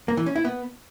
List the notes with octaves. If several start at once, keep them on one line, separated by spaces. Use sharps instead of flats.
A#3
E3
C#4
E4
B3